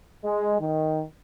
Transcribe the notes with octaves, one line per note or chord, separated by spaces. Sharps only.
G#3
D#3